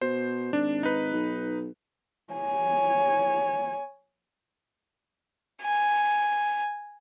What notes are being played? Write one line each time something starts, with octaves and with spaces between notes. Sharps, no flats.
B2 C5
G#1 D4
D#4 B4
B1
C#5 G#5
G#5